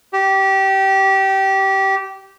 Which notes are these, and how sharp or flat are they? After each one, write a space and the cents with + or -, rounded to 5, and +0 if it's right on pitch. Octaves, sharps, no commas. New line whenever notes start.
G4 -20